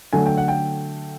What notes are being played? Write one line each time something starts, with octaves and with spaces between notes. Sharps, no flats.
D3 F#3 A3 G#5
G5
F#5
G5